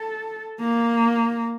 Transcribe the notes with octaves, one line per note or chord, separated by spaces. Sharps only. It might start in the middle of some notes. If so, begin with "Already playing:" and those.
Already playing: A4
A#3